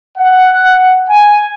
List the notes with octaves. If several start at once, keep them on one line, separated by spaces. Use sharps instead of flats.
F#5
G#5